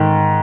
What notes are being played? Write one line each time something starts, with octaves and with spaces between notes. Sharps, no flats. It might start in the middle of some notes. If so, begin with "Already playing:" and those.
Already playing: G#2 D#3